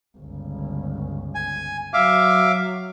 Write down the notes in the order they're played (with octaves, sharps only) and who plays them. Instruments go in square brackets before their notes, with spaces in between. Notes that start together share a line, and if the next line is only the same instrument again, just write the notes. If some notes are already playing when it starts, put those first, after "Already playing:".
[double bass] G1 C#2
[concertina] G#5
[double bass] F#3 [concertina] E5 F5 D6